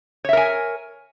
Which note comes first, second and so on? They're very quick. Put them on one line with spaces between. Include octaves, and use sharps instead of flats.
C#5 E5 A#4 G#5